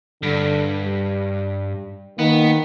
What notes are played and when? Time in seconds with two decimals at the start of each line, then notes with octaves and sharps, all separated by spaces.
0.23 G2 D3
0.84 G3
2.19 D#3 A#3 B3